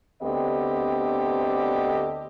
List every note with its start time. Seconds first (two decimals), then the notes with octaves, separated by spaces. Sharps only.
0.22 D2 D3 B3 C4 G4 D#5